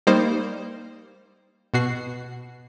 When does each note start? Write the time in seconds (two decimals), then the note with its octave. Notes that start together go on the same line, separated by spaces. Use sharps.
0.07 G3 A#3 D#4 C5
1.74 B2 F#4 C7